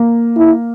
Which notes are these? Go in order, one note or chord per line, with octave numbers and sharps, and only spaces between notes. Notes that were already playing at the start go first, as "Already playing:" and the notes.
Already playing: A#3
E4